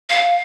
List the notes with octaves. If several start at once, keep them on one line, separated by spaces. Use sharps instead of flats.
F5